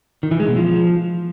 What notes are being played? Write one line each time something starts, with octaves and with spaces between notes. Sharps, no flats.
D#3
E3
G#3
B2
F3